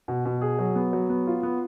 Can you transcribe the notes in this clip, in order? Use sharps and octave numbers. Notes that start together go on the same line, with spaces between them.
B2
B2
G#4
F#3
B3
F#3
B3
F4
B3